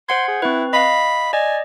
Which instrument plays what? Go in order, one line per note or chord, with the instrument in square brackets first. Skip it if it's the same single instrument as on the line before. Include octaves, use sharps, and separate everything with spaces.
[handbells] C5 F#5 G#6 [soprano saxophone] C6
[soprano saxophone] G#4
[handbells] C4 B4 [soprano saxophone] E4
[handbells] D#5 F5 [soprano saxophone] B5
[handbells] D5 D#5 [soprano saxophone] G#5